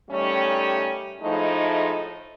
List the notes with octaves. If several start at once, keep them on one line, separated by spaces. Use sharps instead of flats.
D#3 G3 A3 C#4
A2 F3 G#3 A3 D#4